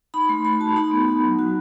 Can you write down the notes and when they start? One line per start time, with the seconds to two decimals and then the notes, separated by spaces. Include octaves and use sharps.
0.14 D#4 B5
0.29 A3 C6
0.45 A3 B5
0.60 F#4 A5
0.76 D#4 B5
0.91 B3
1.08 D#4
1.24 F#3
1.39 F#4